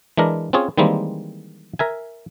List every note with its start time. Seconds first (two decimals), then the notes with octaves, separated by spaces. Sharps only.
0.17 E3 G#3 D4 A#4
0.53 C4 C#4 F4 G#4 C#5
0.78 D#3 E3 G3 G#3 A#3 C4
1.79 A#4 E5 G#5